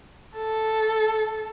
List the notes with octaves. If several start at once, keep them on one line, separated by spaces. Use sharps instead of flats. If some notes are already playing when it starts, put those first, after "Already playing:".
A4